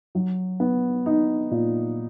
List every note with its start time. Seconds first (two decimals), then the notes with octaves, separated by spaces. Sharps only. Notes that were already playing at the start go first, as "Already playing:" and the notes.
0.15 F#3
0.60 B3
1.06 D#4
1.51 A#2